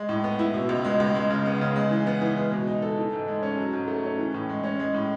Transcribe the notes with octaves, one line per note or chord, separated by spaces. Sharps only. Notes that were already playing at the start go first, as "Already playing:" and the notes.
Already playing: G#3
A2
B3
E4
B2
C#2
G#3
C#2
G#3
C#3
B3
C#3
G#3
E3
B3
E3
G#3
B2
D#4
A4
E3
G#2
G#3
C#4
F#3
G#2
A3
C#4
E3
A2
G#3
C#4
G#3
A2